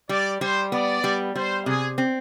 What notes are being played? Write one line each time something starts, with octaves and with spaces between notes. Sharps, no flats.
G3 D5
G3 C5
B3 D5
G3
G3 C5
C3 G#4
C4